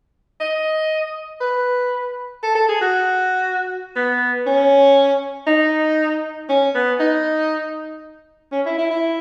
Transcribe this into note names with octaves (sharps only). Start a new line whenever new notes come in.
D#5
B4
A4
A4
G#4
F#4
B3
C#4
D#4
C#4
B3
D#4
C#4
E4
E4
E4